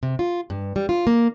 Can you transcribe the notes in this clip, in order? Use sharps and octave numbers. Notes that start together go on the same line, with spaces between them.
C3
F4
G2
G3
F4
A#3